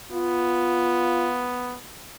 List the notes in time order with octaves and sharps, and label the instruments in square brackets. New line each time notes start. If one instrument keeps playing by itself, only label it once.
[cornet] B3 [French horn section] F4